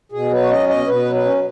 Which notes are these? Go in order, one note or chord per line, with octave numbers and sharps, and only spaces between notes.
B2 G#4
F#3 B4
C#5
C#4 D#5
B2 D#5
B2 B4
F#3
B4
C#4